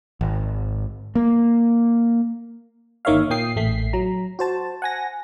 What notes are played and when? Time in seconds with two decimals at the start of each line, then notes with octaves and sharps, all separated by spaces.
0.21 G#1
1.15 A#3
3.05 G1 D#3 A#3 C#5 E5 F5
3.30 A#2 A#3 G5 D#6 C7
3.56 A1 A3 B6 C7
3.93 F#3 A#5
4.39 F#4 C5 A5
4.82 F#5 G#5 A#6